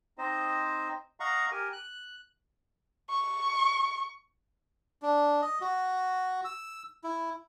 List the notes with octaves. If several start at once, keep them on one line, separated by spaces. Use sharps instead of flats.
C4 D#4 C5 D#5
D#5 F5 F#5 A#5 C#6
G4 A#4 G#5
F#6
C#6
D4
D#5
F#4
E6
E4